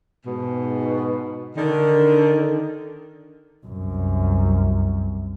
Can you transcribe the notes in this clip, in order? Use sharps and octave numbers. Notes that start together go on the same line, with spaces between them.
G#2 B2
D3 D#3
C2 F#2